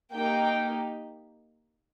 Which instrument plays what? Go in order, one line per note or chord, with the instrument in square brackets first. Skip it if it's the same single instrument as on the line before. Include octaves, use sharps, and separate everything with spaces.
[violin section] A#3 D#4 G4 G5